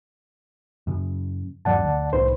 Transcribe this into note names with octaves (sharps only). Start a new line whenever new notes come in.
F#2 C#3
D#1 G2 F#3 D5 F#5 A5
D2
C2 A2 D#4 B4 C5